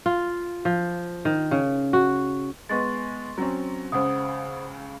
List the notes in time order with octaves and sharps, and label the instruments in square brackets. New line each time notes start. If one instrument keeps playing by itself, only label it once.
[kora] F4
F3
D#3
C#3
F#4
[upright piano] G#3 B3 [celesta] C6 C#6 A6
[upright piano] F#3 C4 C#4
[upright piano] C#2 C#3 [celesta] C5 F#5 D#6